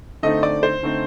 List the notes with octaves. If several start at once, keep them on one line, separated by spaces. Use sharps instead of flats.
D3 A3 C4 D#4 D#5
D5
C5
D3 A3 C4 D#4